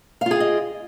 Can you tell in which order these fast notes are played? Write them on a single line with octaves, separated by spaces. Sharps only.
F5 F4 G#4 G5 D#5